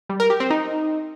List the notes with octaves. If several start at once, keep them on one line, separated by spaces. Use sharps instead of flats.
G3
A#4
G4
C4
D#4